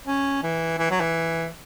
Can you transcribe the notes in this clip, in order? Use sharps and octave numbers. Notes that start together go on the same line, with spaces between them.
C#4
E3
E3
F#3
E3